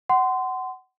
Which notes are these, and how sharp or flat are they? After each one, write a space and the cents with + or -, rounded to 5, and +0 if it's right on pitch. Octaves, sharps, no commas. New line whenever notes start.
F#5 +25 C6 -20